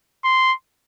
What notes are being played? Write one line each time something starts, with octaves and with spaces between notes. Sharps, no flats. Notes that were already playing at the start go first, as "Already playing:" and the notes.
C6